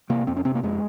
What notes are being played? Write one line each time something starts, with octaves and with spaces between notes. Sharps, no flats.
C3 A#3
F2 C4
C#4
C3 C4
A#3
F2 G#3